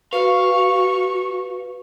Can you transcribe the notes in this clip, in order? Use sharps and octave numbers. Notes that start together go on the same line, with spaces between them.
F#4 B4 F5 C#6